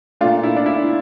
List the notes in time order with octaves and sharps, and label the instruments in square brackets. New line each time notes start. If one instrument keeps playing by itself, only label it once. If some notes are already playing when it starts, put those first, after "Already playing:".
[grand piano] A3 D4 F4
A#2
E4
D4
E4